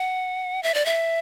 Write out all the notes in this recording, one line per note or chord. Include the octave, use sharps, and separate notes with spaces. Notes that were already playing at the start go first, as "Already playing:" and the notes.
Already playing: F#5
E5
D5
E5